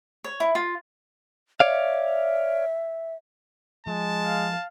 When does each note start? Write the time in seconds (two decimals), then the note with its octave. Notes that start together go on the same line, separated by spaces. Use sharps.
0.24 C#5
0.40 E4
0.55 F4
1.60 C#5 D5 E5 F5
3.87 F3 G#3 A5
4.25 F5